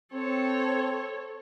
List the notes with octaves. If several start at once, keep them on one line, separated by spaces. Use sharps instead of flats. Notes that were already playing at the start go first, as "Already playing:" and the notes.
C4 A4 C#5